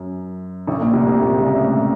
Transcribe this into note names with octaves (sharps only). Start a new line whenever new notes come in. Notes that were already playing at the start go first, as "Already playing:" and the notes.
Already playing: F#2
A1 A2
A#1 A#2
C2 C3
C2 C3
A#1 A#2
C#2 C#3
A2 A3